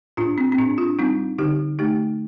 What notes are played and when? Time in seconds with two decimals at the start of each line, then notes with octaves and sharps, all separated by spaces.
0.17 A2 D4 F4
0.38 C4
0.52 C4
0.58 A2 D4
0.78 D4 F4
0.99 G3 C4 D#4
1.38 D3 D#4 G4
1.79 A3 D#4 G4